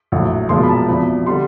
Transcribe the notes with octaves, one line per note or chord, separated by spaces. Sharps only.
A#1 A2 F#3
B1 A#2 F3 G#3 C6
B5
A5
A#5
E2 C3 F3 B5
D3 G3 C6